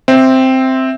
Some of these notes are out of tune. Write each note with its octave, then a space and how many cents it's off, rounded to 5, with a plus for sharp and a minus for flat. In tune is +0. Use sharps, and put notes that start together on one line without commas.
C4 +0 E5 -5